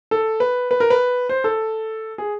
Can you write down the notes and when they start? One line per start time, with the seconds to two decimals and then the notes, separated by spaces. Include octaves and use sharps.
0.11 A4
0.40 B4
0.71 B4
0.80 A#4
0.90 B4
1.29 C5
1.44 A4
2.18 G#4